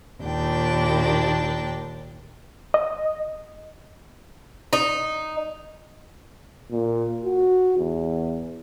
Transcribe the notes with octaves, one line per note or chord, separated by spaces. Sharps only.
D#2 A#2 D4 G5
D#5
D#4
A#2
F#4
E2